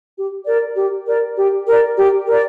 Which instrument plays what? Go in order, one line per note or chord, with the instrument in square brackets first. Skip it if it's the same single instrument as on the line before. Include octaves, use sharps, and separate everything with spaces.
[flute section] G4
A#4 D5
G4
A#4 D5
G4
A#4 D5
G4
A#4 D5